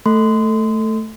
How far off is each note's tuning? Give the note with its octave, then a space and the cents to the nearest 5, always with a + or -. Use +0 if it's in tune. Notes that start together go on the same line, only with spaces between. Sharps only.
A3 +0 A4 +10 C6 -25